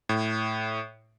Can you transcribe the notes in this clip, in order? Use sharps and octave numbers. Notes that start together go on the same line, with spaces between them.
A2